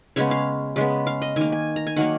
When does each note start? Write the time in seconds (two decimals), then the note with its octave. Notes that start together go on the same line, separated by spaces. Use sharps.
0.16 C#3 G#3 B3 C#5
0.31 F5
0.76 C#3 G#3 B3
1.07 F5
1.22 D#5
1.36 D#3 A#3 G#5
1.52 G#5
1.76 A#5
1.87 G#5
1.96 D#3 F#3 A#3 F#5